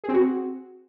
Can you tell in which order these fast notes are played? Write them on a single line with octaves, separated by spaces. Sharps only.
G#4 C4 F#4